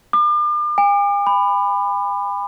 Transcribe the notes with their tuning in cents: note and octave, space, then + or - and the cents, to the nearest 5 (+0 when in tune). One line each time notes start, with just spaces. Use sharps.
D6 +40
G#5 -45
B5 +15